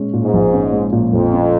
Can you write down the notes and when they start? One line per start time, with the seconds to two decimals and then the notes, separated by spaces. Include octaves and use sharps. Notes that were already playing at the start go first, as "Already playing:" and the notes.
Already playing: A#2 G#3 C#4
0.13 A#2
0.23 G#2
0.33 A#1
0.53 C#4
0.73 G#3
0.93 A#2
1.13 A#1 F2
1.33 C#4